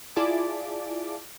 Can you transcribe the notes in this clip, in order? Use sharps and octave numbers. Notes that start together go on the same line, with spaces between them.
E4 F4 G#4 D5 A5 D6